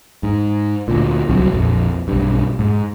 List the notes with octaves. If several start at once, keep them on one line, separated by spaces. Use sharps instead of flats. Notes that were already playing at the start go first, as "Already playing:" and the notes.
G#2
D2 A#2
D1 C2 F#3 C4
A#1 F2
B1 G2
G#2